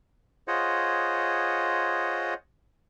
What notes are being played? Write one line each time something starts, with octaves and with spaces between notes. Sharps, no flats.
F4 G#4 C5 C#5 D#5 F#5